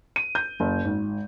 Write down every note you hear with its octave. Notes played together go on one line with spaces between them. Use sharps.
D#7
G6
F#1
G#1